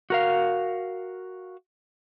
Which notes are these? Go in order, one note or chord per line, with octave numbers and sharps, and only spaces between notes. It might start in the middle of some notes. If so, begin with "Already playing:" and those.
F#4 A#4 F5